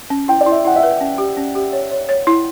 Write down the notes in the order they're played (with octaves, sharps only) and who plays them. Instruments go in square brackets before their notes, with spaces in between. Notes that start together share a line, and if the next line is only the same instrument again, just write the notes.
[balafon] C#4
[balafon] E4 [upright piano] G5
[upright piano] D5
[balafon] E4
[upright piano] E5
[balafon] E4 [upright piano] F#5
[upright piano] E5
[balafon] B4
C#4
G4
C#4
G4
C#5
C#5
C#5
E4